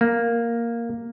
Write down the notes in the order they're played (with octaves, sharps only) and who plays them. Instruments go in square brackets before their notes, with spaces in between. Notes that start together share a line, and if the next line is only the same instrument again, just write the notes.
[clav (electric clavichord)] A#3